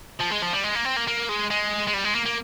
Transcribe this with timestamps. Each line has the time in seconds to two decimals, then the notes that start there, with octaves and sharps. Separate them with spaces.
0.21 F3
0.31 G#3
0.43 F3
0.53 G3
0.64 G#3
0.75 A#3
0.85 C4
0.97 A#3
1.08 A#3
1.29 G#3
1.50 G#3
1.87 G#3
1.94 G3
2.04 G#3
2.15 A#3
2.26 A#3